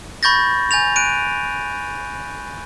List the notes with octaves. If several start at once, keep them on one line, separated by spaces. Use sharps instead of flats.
B5 C#6 G6 A6 A#6
G#5 G6 A6 F7
F#6 D7 D#7